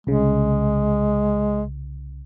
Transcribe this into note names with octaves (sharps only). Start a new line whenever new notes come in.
C2 C#3 G#3